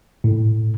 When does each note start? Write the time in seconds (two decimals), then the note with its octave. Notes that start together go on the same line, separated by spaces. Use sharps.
0.24 A2